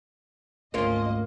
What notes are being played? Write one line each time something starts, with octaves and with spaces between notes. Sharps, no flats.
G#1 D2 A#3 C#4 F4 D#5